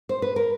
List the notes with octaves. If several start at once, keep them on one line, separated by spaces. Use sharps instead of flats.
C5
B4
A#4